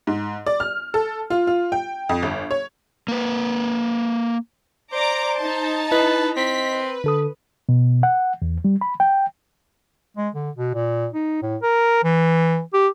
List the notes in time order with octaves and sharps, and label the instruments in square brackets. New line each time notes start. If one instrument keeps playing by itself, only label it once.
[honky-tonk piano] G#2
D5
F6
A4
F4
F4
G5
F2
G1
C#5
[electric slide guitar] A#3 B4
[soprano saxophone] C5 [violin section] D5 A#5 D6
[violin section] D#4 A5
[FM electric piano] E4 D#5 [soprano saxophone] B4
[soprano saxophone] C4 [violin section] B6
[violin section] B4
[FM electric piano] D3 A4 D#6
[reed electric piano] B2
F#5
E2
G3
B5
G5
[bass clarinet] G#3
D3
B2
A#2
D#4
A2
A#4
E3
G4